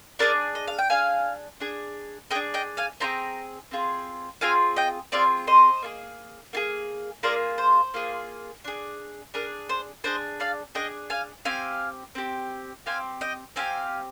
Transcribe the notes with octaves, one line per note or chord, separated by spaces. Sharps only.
D4 G#4 A#4 D5
D#5
F5
G5
D4 G#4 F5 G#5
D4 G#4
D4 G#4 D#5 G5
D#5 G5
F5 G#5
C4 F4 G#4 G5 A#5
C4 F4 G#4
C4 F4 G#4 F5 G#5
D#5 G5
C4 F4 G#4 D5 F5
C5 D#5
A#3 F4 G#4
A#3 F4 G#4
A#3 F4 G#4 A#4 D5
C5
A#3 F4 G#4
D4 G#4
D4 G#4 A#4
C5
D4 G#4 C5 D#5
D5 F5
D4 G#4 D#5 G5
F5 G#5
C4 G4 F5 G#5
C4 G4
C4 G4 F5 G#5
D#5 G5
C4 G4 F5 G#5